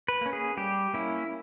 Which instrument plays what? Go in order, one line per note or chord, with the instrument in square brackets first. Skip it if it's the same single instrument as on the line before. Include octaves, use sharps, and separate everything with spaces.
[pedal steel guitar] B4
A#3 C#4
G#4
G3 G4
A#3 C#4 E4